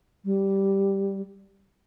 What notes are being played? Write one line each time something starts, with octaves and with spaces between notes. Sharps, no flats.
G3